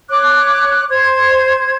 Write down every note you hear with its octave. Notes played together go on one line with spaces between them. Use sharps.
C#5 D6 F#6
C5 G#6